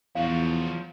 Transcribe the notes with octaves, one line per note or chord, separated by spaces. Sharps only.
E2 F3 F#4 F5